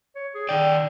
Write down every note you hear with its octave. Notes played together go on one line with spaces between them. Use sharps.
C#5
G#4
D#3 D5 G5